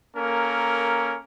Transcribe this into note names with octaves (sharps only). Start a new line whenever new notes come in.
A#3 C#4 A4 A#4